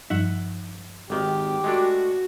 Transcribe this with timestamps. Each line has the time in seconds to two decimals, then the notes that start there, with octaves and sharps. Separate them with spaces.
0.10 G2 F3 D#4 E5 F#5
1.10 G#1 D#3 G4
1.64 G#3 A3 D4 F#4